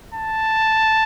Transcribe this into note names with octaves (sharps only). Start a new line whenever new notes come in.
A5